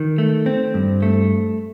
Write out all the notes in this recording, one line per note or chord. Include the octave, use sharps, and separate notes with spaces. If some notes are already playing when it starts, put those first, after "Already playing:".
Already playing: D#3
A3
C4
G2
A3